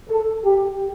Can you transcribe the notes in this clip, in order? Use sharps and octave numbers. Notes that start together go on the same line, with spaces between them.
A4
G4